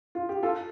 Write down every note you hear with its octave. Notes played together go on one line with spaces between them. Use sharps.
F4
G4
F4 A4